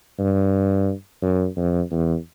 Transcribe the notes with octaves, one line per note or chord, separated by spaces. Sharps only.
G2
F#2
F2
E2